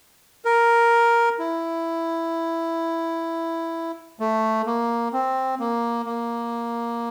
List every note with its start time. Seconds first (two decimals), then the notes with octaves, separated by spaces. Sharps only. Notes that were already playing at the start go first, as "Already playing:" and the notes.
0.45 A#4
1.39 E4
4.20 A3
4.66 A#3
5.13 C4
5.60 A#3
6.06 A#3